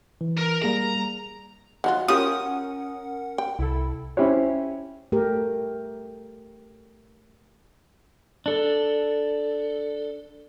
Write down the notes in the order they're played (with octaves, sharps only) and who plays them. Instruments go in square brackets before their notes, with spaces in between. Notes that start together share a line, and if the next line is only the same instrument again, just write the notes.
[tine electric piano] E3
[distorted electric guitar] A#4
[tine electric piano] G3 A#3 G#4 [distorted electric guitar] A#5
[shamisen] D#3 F#3 F4 [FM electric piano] F#5
[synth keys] C#4 A#4 [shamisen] F4 G4 C#5 [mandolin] D#6
[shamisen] G5
[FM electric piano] C2 [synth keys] E4 A4
[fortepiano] C#4 E4 G4 C5 C#5
[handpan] A3 G4 A#4
[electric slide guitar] D4 A4